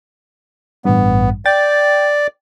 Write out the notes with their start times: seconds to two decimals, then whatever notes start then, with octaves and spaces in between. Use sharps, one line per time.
0.85 A1 G2 B3
1.46 D5 G5 A6